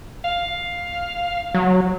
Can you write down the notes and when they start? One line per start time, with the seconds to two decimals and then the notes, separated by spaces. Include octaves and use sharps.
0.24 F5
1.55 F#3